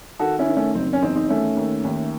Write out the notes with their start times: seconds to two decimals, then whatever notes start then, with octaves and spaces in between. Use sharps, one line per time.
0.19 D#3 F#4 A4
0.39 C#4 E4
0.47 D#3
0.56 A3 C#4
0.74 F#1 C4
0.93 C#4
1.02 E2 C4 D#4
1.15 C4 D#4
1.29 D#3 A3 C#4
1.57 D#2
1.84 D#2